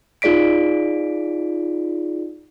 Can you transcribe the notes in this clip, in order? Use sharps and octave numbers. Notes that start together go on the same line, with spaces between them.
D#4 F4 G#4 D5 B6 D7